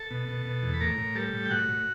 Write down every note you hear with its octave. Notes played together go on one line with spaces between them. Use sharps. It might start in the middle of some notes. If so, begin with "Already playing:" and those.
Already playing: A4 A5
B2
B2
B2
E2
B5
A2 A#4 A#5
A2
G3 A4 A5
A2
G5
A2 F#4 F#5
A2